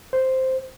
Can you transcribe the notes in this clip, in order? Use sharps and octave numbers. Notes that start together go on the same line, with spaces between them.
C5